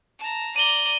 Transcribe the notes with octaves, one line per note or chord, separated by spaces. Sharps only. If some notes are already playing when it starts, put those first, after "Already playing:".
A5 A#5
D5 A#5 D#7 F#7 G7